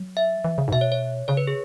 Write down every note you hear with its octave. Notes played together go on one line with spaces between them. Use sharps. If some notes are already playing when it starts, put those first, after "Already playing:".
Already playing: F#3
E5
E3
C#3
G#2
B2 E5
C#5
C#5
C#3 C#5
B4
G#4